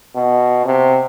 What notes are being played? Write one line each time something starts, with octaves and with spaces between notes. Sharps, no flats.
B2
C3